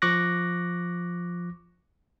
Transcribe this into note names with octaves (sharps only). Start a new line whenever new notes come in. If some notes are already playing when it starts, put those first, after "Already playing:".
F3 C#6 D6 F#6 A#6